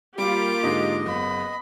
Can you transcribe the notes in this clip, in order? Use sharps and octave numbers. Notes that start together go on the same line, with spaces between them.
G3 A#3 F4 G4 D6
G#2 D3 G#3 D#5
F#1 B3 B5